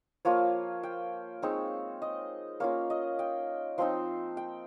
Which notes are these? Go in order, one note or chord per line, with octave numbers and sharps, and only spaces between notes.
F3 A#3 F4 C#5
G5
G#3 C4 D#4 C#5
D#5
A#3 C#4 F4 C#5
D#5
G5
F3 C4 D#4 C6
G5